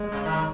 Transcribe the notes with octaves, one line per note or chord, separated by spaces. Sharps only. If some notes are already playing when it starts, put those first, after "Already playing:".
Already playing: G#3
C#3
D#3